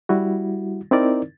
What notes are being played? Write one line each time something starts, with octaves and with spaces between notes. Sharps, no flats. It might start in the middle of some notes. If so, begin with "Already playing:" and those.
G3 E4 F#4
C4 D#4 E4 A#4 D5